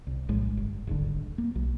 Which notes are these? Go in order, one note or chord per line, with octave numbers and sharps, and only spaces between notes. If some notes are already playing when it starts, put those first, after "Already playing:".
C2
A#1 A2 G#3
G1
D#1 G#1 D3
A#3
B1